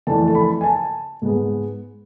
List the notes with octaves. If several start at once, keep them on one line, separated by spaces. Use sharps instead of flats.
F2 E3 A3 D4 A5
A5
B5
G#5
A5
G#2 G#3 B3